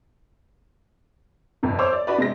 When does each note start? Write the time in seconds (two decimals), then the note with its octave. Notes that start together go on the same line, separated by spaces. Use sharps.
1.63 G1 F2 C3
1.79 C5 C#5 D6 E6
1.93 D5
2.07 D4 F#4 B4 D5
2.18 C3 G#3 A#6